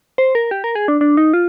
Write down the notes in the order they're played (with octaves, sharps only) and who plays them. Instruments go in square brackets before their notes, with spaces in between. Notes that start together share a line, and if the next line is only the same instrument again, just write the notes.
[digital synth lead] C5
A#4
G4
A#4
G#4
D4
D4
D#4
F4